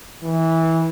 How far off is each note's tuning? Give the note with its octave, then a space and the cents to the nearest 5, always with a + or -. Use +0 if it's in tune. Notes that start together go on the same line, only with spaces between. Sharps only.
E3 -15